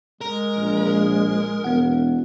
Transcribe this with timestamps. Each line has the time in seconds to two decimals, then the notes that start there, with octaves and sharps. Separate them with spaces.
0.21 G#3 A#4
0.56 A#1
1.64 E1 B3 F#5